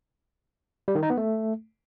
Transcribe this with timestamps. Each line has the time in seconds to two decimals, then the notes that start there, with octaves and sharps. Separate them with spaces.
0.88 G3
0.95 D#3
1.03 D#4
1.10 B3
1.17 A3